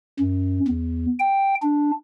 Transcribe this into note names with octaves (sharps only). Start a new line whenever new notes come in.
F#2
E2
G5
D4